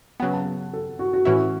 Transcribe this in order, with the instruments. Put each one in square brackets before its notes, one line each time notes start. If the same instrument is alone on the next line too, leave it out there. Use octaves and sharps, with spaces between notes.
[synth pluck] C#3 F#3 B3 [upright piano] F#5
[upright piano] A5
A4
F#4
F#4
[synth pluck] A2 E3 C#4 E4 [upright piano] F#4